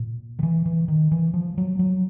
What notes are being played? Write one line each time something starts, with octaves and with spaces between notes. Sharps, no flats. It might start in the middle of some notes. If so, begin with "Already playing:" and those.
Already playing: A#2
D#3
E3
E3
D#3
E3
F3
F#3
F#3